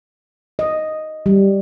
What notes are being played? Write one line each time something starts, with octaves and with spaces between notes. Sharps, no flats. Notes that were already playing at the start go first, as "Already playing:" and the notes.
D#5
G3